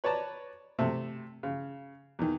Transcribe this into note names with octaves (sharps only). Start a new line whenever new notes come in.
B4 C#5 D5 A5 A#5
C3 A3 E5
C#3
E2 D#3